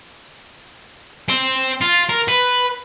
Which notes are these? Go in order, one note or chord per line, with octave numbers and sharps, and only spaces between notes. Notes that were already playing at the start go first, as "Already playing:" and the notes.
C4
F4
A#4
B4